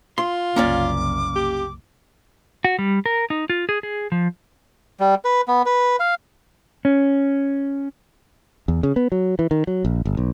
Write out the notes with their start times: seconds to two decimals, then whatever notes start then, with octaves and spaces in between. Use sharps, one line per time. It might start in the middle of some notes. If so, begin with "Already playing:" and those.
0.18 F4 C6
0.56 F#1 C2 A#3 C#4 D5 D6
1.36 G4
2.65 F#4
2.79 G3
3.06 A#4
3.30 D#4
3.50 F4
3.69 G#4
3.83 G#4
4.12 F3
5.00 G3
5.25 B4
5.48 B3
5.66 B4
6.00 F5
6.85 C#4
8.68 E2
8.83 C#3
8.96 B3
9.12 F#3
9.39 E3
9.51 D#3
9.67 F#3
9.85 A#1
10.05 G1
10.17 B1